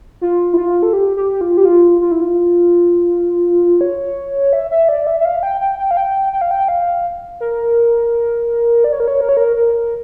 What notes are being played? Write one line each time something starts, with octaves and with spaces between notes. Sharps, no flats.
F4
E4
F4
A4
G4
G4
F4
G4
F4
F4
E4
F4
C#5
E5
E5
D5
E5
E5
F5
G5
G5
G5
F5
G5
G5
F5
G5
F5
A#4
D5
C#5
A#4
C#5
A#4
C#5
A#4
A#4